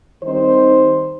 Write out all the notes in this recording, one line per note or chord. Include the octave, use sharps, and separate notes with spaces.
D#3 G3 C4 D#4 C5